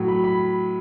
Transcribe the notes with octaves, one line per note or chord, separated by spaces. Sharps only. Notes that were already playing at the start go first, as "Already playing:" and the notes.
Already playing: A2 F#3
B5
B5